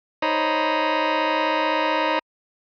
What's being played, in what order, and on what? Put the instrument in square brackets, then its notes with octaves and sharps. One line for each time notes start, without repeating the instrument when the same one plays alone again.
[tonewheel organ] D#4 C5 C#5 D#5 A#5 B5